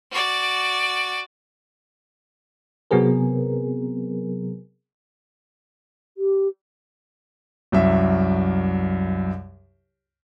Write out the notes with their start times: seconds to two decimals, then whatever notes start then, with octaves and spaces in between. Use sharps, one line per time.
0.11 F#4 D5
2.91 C3 F#3 B3 C4 G#4 A#4
6.18 G4
7.72 C2 F#2 E5